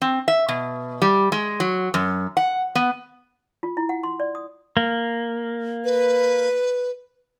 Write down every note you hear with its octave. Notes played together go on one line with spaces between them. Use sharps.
C4
E5
B2
G3
G#3
F#3
F#2
F#5
B3
F4
E4
F#5
C6
D5
D#6
A#3
B4